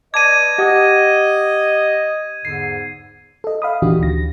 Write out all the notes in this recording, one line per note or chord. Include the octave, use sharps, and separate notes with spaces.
B4 D5 D#5 A5 D6 G#6 D#7
G4 D#5 F#5
E2 G#2 D3 C7
A4 D#5
E5 F5 B5 D#6
A#2 D#3 E3 D4 F#4 G4
D2 A#6